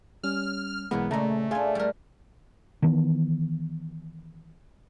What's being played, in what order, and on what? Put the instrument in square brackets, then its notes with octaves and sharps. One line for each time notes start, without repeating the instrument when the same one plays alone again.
[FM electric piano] G3 C#4 [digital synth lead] F6
[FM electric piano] B1 E3 G#3 [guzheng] A#3 A#4 C#5 [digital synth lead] B3
[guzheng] A#2 G#3 [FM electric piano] C#3 A#5 [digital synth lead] A3
[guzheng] D4 F4 [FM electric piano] G#4 F5 G#5
[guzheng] G3 A#4
[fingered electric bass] D#3 E3 B3